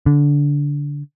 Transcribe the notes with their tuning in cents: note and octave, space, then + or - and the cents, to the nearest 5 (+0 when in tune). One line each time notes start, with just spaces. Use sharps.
D3 -20